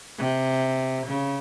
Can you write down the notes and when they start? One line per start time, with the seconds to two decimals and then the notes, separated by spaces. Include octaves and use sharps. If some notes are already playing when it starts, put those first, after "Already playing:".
0.18 C3
1.07 C#3